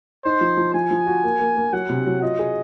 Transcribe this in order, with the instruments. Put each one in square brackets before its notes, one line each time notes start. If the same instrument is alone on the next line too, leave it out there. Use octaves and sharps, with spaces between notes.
[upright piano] D#4 [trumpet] C5
[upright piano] F3
F3
[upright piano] F3 [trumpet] G#5
[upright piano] F3
F#4
A#3
A#3
A#3
[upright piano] F#3 [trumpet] F#5
[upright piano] C3
F#3
[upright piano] F4 [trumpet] D#5
[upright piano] G#4